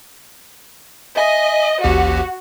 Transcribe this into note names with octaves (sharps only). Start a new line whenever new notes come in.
D#5 E5 G#5
A1 D#2 F#4 G4